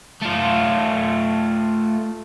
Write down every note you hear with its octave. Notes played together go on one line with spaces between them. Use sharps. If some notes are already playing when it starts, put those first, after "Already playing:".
A3 F4